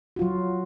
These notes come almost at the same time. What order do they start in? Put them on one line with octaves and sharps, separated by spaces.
F#4 F4 F#3